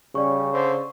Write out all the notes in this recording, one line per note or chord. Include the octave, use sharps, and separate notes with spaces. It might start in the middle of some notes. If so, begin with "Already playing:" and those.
C#3 G3 C#4 D5 C#6
D3 C5